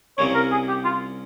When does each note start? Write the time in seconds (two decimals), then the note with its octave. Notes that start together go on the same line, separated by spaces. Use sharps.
0.18 C2 C3 G3 A#3 C#4 C#5
0.35 A#4
0.51 G#4
0.68 G4
0.85 F4